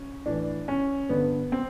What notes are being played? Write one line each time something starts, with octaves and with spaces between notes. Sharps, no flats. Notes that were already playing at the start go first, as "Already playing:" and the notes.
Already playing: C#4
A2 E3 D4
C#4
G2 D3 B3
C4